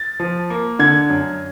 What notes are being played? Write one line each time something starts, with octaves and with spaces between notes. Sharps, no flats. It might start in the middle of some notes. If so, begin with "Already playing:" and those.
Already playing: A6
F3
A#3
D3 G#6
F#2